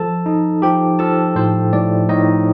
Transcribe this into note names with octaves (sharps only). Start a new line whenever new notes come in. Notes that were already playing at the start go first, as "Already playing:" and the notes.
Already playing: F3 A4 A5
D#4
F3 G4 G5
F3 A4 A5
A2 C5
A2 D5
A2 D#4 D#5